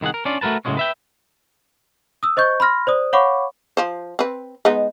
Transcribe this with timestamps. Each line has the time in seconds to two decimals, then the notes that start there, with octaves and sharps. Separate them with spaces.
0.01 C2 D#3 E4 G#4 F#5
0.14 A#4
0.25 C#4 D4 F4 D5
0.41 A3 F#4 A#4 B4 A5
0.65 A2 C#3 E3 F#3 G#3 C#4
0.77 B4 E5 G5
2.23 D#6 E6
2.37 C5 D#5 C#6 G6
2.60 B5 C6 F6 A#6
2.87 C5 D5 D#6
3.13 C#5 F5 F#5 B5 C#6 D6
3.77 F3 C5
4.19 C4 B4
4.65 G#3 B3 D#4